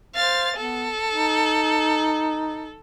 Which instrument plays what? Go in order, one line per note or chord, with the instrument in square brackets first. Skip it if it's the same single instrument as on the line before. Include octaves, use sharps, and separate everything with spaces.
[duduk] C5 [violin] F5 A6
[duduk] B3 [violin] A4
[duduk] D#4